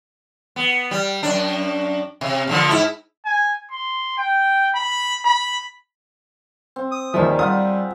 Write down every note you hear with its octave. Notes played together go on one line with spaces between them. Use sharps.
B3
G3
F#2 D4
C3
A#2 D3 F3
G#2 E4
G#5
C6
G5
B5
B5
C4
D#6
D#2 D#3 F3 G3 G#4 E5
G3 F4 E5 F#5 D#6